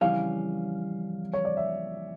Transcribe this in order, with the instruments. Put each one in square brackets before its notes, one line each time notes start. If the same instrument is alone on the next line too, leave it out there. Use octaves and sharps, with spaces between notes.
[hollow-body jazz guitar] F2 C#3 E3 G3 C#4 [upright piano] F5
[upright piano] C#5
D5
E5